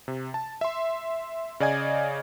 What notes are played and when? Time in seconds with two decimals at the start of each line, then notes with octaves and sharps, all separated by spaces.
0.08 C3
0.34 A5
0.61 E5 C6
1.60 C#3 D5 D#5 G#5 G#6